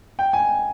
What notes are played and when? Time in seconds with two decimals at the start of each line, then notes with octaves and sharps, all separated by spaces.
0.19 G5
0.33 G#5